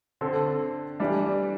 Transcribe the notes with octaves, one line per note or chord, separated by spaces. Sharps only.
D3 C4 A4
E3 G3 D4